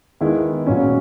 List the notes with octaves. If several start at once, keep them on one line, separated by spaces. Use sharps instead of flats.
D#3 G#3 B3 E4
A#2 F#3 C#4